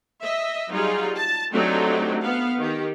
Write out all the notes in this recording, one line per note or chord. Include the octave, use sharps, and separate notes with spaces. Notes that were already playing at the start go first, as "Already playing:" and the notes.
D#5 E5
F#3 G3 D#4 F4 G#4
A5
F#3 A3 C4 D4 D#4 G4
B3 F5
D#3 G4